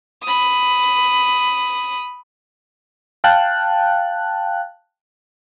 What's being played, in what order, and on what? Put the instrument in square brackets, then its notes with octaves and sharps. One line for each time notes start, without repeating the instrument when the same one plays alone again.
[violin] B5 D#6
[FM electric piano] F5 G5 A5 F#6